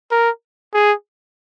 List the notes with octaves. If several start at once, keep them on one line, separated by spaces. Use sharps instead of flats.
A#4
G#4